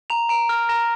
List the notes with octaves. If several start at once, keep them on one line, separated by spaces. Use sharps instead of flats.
A#5 F7
A#5 D7
F6
A#5 A#6